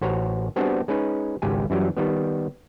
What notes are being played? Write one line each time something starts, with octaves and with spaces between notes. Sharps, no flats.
A1 F#4 C5 C#5 F#5 A#5
G3 B3 C4 D4 F#4 G#4
G#3 C#4 D#4 B4
G#1 C#2 G4 G#5
F#2 E3 F#3 G3
D#3 G3 B3